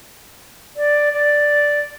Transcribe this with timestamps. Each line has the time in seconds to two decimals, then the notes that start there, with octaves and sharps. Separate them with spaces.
0.76 D5
1.13 D5